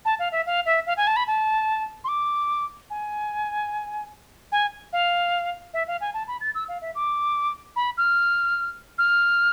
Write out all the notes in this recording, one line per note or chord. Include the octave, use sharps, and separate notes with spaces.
A5
F5
E5
F5
E5
F5
G#5
A5
B5
A5
C6
D6
G#5
G#5
F5
E5
F5
G#5
A5
B5
A6
E6
F5
E5
D6
B5
F6
F6